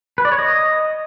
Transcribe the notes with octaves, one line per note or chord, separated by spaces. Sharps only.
B4
D5
C#5
D#5